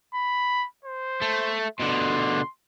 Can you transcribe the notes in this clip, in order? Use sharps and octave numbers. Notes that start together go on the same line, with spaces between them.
B5
C5
A3
B2 D3 C6